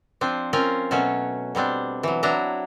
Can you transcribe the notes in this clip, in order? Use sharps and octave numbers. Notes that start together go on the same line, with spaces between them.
F3 C4 D4
C4 C#4 F4 A#4
B2 F#3 A3 C#4
B2 G3 C4 D4
E3 F#3
F#3 D4 E4 A#5